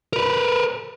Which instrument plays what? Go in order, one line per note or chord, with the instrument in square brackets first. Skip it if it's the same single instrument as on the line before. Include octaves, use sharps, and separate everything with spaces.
[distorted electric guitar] A#4 B4